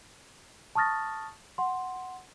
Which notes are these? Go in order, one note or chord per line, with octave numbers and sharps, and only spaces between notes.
A5 C#6 D#6 F6 A6 A#6
F#5 C6